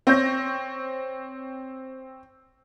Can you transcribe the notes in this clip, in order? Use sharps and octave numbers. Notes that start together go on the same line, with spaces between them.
C4 C#5 G6 A#6